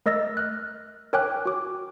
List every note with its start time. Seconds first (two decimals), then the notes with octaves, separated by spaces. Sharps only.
0.06 A3 A#4 D#5 E6 A6 A#6
0.37 F6 F#6
1.13 A#4 C#5 G5 G#5 D6 F#6
1.45 F#4 D6